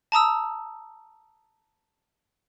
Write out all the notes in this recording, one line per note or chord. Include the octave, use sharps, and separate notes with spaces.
A5 A#5 D#6 E6